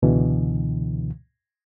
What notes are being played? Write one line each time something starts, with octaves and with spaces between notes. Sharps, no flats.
C#2 B2 D3 E3